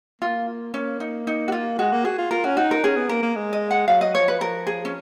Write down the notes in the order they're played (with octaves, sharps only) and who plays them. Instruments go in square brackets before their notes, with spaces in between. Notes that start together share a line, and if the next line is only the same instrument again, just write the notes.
[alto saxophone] A#3 [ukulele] F4
[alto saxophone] A#3 [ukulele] C#4
[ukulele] D#4
D#4
F#4
F4
[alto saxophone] G#3 [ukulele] F#4
[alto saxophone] A#3
[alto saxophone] F#4 [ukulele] G#4
[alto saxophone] F4
[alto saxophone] F4 [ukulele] A#4
[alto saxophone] C#4 [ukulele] F#4
[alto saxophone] D#4 [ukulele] F#4
[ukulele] A#4
[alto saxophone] C#4 [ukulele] G#4
[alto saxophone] B3
[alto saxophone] A#3 [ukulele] A#4
[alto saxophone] A#3
G#3
[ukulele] D#5
F#5
[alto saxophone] F#3 [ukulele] F5
[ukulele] D#5
[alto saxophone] F3 [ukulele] C#5
[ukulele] B4
[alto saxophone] F3 [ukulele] A#4
[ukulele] G#4
C#4